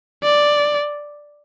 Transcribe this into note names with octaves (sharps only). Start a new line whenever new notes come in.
D5